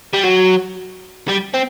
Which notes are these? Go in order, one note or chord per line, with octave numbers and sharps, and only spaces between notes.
G3
F#3
G3
C4